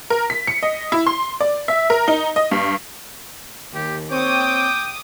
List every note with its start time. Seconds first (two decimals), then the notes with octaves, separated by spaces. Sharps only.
0.10 A#4
0.30 B6
0.47 C#7
0.63 D#5
0.92 E4
1.07 C6
1.41 D5
1.68 E5
1.90 A#4
2.08 D#4
2.36 D#5
2.51 G2
3.74 D#2 G4
4.11 C4 C#5 G5 D6 D#6